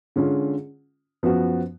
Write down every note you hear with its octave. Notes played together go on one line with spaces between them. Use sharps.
D3 G#3 C#4 F4
F#2 F3 B3 F#4